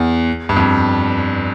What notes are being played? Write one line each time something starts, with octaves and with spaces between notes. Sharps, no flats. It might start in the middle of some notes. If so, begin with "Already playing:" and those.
Already playing: E2
G2
F2